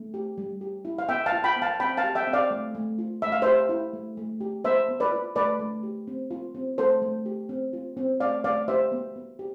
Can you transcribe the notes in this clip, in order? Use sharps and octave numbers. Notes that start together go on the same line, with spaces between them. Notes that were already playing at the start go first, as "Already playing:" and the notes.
Already playing: A3
G4
G3
G4
E4
F5
B3 E5 G5
F5 A5
F4
G5 B5
B3
F5 A5
C4 G5 B5
F5 A5
G4
E5 G5
C4
D5 F5
A3
A3
F4
A3 E5
F5
G4 C5 E5
E4
A3
A3
G4
B3 C5 E5
B3
B4 D5
F4
A3 B4 D5
A3
G4
C4
F4
C4
A3 A4 C5
A3
G4
C4
F4
C4
A3 D5 F5
A3 D5 F5
G4 C5 E5
B3
B3
G4